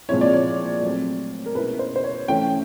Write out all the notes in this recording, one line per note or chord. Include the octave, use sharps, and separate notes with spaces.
A#2 F3 G#3 C4 E4 C#5
D5
C#5
F#3 A3 C4
A#4
B2 G#3 C#4 E4 B4
C5
C5
C#5
E3 A3 C#4 G5